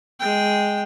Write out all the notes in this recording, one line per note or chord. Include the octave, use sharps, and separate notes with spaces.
G#3 G5